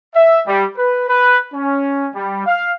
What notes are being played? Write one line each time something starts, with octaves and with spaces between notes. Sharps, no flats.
E5
G3
B4
B4
C#4
G3
F5